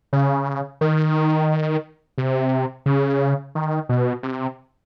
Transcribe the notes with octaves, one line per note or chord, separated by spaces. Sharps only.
C#3
D#3
C3
C#3
D#3
B2
C3